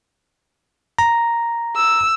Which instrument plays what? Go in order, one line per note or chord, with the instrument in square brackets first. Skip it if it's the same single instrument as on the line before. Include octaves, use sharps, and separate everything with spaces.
[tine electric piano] A#5
[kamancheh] E6